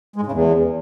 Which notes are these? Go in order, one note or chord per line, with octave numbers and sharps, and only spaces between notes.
G#3
G#2
C#3
E2